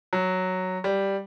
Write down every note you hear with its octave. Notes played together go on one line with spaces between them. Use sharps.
F#3
G3